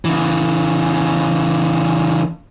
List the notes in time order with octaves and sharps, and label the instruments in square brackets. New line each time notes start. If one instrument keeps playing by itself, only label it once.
[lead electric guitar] C#3 E3